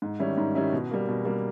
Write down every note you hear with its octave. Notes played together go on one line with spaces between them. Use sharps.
G#2
D#3 G3 C#4 E4
G#2
D#3 G3 C#4 E4
B2
G3 A#3
B2
G3 A#3